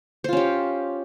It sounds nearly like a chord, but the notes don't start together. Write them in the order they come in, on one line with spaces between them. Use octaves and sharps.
C5 F4 C#4 G4